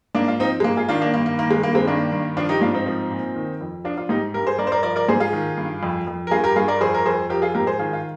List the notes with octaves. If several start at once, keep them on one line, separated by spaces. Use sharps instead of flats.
G#2 A#3 D4
F4
F3 C4 D#4
G#3
G#2 A#3
F4 G#4
D#3 D4 F4
A#3 D4
G2 A#3
A#3
D#3 A#3
G#3
G2 A#3
G#3 C4
D#3 A#3 D4
G2
F3 D4 F4
D#4 G4
G#2 D4 F4
C4 D#4
F3
A#2
D#3
F2
F3 D4 F4
D4 F4
G#2 D#4 G4
G2 G4 A#4
G#4 C5
G2 A#4 D5
C5
A#4 D5
F3 A#4 D5
A#4 D5
G#2 G#4 C5
F4 G#4
D#3
G2
F2
F2
A#4
G2 F4 G#4
G4 A#4
G2 F4 G#4
A#4 D5
F2 G#4 C5
A#4
F2 G#4 C5
F3 G4 A#4
F4 G#4
G#2 G4 A#4
G#4 C5
D#3 F4 G#4
F4